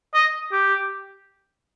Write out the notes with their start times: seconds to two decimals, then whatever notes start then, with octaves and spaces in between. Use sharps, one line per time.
0.14 D#5
0.52 G4